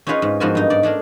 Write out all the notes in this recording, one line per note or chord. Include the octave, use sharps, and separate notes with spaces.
C#4 D#4 F4 G#4 B4 C#5
G#2
G#2 F3 B3 F#4 A#4 G#5
G2 D#4
G#2 D5
A3 D4 G#4 A#4